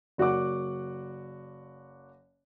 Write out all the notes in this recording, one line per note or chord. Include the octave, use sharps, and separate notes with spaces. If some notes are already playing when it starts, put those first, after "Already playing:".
F#1 F#4 D5 F#5 D6